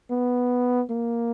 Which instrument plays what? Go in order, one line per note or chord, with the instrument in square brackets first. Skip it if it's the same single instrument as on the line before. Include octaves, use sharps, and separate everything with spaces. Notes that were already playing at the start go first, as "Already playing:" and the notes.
[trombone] B3
A#3